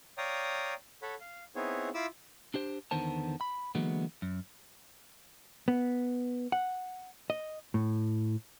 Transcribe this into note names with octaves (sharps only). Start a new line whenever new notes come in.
C#5 D5 F5 G5 A#5 D#6
A4 C#5 F#5 B5
F5
B3 C4 D#4 E4 G#4 C#5
E4 F4 B5 D6 E6
D4 G4 C5
E2 D3 D#3 B3 C5 A5
B5
D3 E3 F#3 G#3 A#3 B3
F#2
B3
F#5
D#5
A2